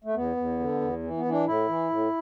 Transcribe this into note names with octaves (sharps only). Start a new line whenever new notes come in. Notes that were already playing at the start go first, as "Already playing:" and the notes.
A3
E2 B3
E2
D3
E2
E3
B3
E3
D4
A2 E4
E3
A2